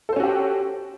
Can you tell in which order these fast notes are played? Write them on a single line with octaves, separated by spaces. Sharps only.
A4 C5 C#4 F#4 G4